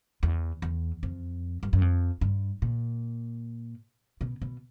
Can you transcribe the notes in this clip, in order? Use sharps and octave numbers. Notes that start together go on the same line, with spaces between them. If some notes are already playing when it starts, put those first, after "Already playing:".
E2
E2
F2
G2
F#2
F2
G2
A#2
B2
B2